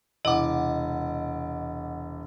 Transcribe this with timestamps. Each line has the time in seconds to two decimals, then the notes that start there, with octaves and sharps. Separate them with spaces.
0.25 E1 C3 E4 D#5 F#5 D6